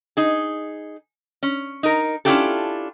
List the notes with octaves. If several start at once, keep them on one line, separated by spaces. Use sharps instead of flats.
D#4 G#4
C#4
D#4 A#4
C#4 D4 E4 F4 G4 A4